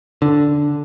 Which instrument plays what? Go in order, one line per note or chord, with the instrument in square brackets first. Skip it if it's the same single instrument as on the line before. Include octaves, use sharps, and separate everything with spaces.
[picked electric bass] D3